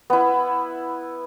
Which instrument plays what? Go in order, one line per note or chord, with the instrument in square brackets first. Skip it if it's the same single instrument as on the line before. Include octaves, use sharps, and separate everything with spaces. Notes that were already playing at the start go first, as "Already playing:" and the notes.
[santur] B3 E4